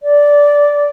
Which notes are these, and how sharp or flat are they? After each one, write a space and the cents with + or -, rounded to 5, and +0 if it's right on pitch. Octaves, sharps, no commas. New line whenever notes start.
D5 -10